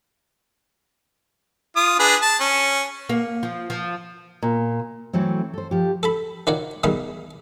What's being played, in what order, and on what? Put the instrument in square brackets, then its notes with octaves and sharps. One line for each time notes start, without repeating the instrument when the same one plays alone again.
[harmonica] F4 D#6
D4 G#4 B4
A5
C#4
[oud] A#3
F3
F3
[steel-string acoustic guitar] A#2
E3 F#3 A3 C4
A4 C5
F3 G4
[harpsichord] A4 A5 B5
D#3 F4 F#4 C#5 D5
B2 D#3 G3 E4 G#4 F5